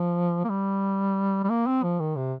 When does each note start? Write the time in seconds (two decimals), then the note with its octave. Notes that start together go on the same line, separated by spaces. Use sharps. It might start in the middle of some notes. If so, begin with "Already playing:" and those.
Already playing: F3
0.45 A#3
0.49 G3
1.44 G3
1.50 A#3
1.67 C4
1.83 F3
2.00 D#3
2.16 C3